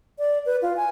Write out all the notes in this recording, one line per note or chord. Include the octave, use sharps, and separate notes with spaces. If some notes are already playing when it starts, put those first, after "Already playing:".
D5
B4
F4
G#5